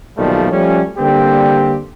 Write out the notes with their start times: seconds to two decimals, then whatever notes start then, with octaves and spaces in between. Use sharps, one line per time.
0.18 B1 A#2 D#3 F3 G3 A3
0.52 F3 G3 A3 C#4
0.98 D3 G3 A#3 C4 G4